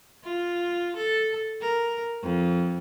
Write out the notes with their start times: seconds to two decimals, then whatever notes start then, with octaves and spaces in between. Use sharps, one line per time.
0.24 F4
0.97 A4
1.61 A#4
2.23 F2